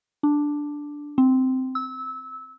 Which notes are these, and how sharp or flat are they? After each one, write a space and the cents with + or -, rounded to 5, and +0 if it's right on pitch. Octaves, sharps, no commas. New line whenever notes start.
D4 +0
C4 -10
E6 -20